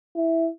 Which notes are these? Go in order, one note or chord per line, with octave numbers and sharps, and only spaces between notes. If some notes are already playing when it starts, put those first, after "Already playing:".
E4